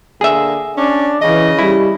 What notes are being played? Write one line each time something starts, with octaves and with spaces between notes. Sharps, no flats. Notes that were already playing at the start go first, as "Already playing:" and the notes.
D3 A#3 G#4 E5
C#4 D4
C#3 E3 D#5
G3 E4